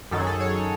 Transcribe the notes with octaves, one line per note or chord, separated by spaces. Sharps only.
F#2 D#3 F#3 A4
G#4
A4
C#5